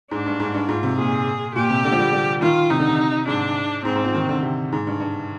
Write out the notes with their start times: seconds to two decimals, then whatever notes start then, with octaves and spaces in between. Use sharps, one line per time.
0.11 G#2 D4
0.26 G2
0.40 G#2
0.54 G2
0.69 G#2 F4
0.83 C3
0.98 A#2 G#4
1.55 A#2 G4
1.70 C3
1.84 D3
1.92 F3
1.99 G3
2.13 G3
2.42 D#3 F4
2.70 C3 D#4
2.79 D3
2.89 C3
3.27 G#2 D4
3.85 G#2 C4
3.96 G#2
4.05 F3
4.14 D#3
4.23 C3
4.29 D3
4.39 D3
4.43 C3
4.73 G#2
4.87 G2
5.00 G2